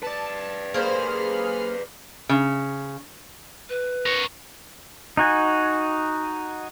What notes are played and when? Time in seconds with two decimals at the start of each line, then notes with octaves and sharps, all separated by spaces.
0.03 B4 D5 A5
0.74 A#3 G#4 C5 B5 F6
2.29 C#3
3.69 B4
4.06 A#4 C#5
5.17 D#4 F#4 G#5